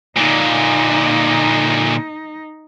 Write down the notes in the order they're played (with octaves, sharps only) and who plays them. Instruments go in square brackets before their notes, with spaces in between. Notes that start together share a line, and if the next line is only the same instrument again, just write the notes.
[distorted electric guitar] A#2 D3 [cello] D#4